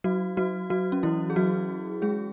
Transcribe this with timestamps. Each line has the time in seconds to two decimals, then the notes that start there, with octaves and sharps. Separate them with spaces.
0.04 F#3 F#4
0.37 F#3 F#4
0.70 F#3 F#4
0.92 C#4
1.03 E3 E4
1.30 G#4
1.36 F#3 F#4
2.02 G#3 G#4